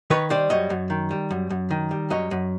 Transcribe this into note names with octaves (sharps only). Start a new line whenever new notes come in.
D#3 B4 C#5
G3 C5 D5
F#2 C#5 D#5
F#2
D#3
G3
F#2
F#2
D#3
G3
F#2 C#5 D#5
F#2